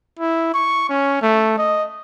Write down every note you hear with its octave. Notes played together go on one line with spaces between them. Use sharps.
E4
C#6
C#4
A3
D#5